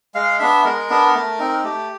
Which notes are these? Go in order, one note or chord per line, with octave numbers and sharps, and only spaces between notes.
G#3 F5
B3 D4 E5
G#3 A#4
B3 D4
A3
C4 D#4
A3 G4